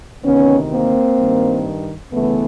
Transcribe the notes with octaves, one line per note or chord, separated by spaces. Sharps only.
D2 C3 D#3 B3 C#4
A#3 C4
G2 D#3
D2 C#3 E3 A3 B3